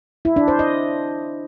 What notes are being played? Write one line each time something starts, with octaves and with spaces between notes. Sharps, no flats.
E4
D4
C5
D#5